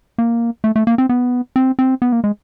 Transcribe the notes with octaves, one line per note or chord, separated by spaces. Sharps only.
A#3
A3
A3
A#3
C4
B3
C4
C4
B3
A#3
G#3